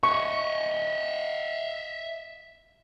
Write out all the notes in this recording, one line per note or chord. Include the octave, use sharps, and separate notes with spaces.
D#5 E5 C#6